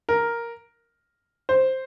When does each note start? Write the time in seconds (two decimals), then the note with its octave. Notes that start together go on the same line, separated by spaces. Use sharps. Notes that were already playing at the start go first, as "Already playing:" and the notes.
0.09 A#4
1.49 C5